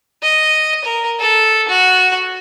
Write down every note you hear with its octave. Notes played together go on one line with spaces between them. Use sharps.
D#5
A#4
A4
F#4